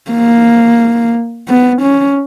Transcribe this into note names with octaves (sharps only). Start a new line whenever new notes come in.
A#3
B3
C#4